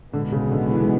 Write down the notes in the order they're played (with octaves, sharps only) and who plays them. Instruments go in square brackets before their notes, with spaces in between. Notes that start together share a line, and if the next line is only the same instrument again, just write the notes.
[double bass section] B1 B2 G#3 B3 [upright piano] D3
[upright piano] C#3
D3
E3